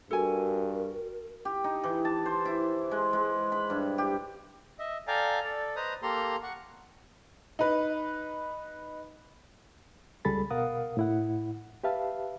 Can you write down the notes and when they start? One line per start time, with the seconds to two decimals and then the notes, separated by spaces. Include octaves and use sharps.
0.11 G2 F#4 A4 A#4 G#5
1.45 G4
1.64 D#4
1.84 E3
2.05 A5
2.26 C5
2.45 E4
2.91 G#3
3.13 G#3
3.52 B5
3.70 G2
3.98 G4
4.79 D#5 E5
5.08 A4 D5 F5 G5 G#5 A#5
5.44 A4 D5
5.76 B4 C5 D#5 A#5 D#6
6.02 A#3 G4 A4 A#5 C6
6.43 F#5 C#6
7.59 D#4 B4
10.25 C#2 G3 G#4 A4 B5 A6
10.50 B2 A#4 F5 F#5 D#6
10.97 A2 E4 F#5
11.84 G4 B4 E5 F5 A5